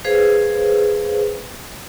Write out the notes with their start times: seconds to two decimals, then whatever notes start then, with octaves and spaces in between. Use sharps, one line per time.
0.04 G#4 B4 C5 F5